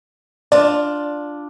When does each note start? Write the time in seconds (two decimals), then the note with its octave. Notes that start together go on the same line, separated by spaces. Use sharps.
0.52 D4 F4 D5